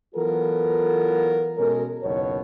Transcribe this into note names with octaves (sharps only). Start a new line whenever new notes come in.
E3 F#3 B3 F4 A4 A#4
B2 G#3 C#4 A4 A#4
F#1 D#2 B2 C#5